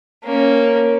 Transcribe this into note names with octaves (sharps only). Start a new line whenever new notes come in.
A#3 C#4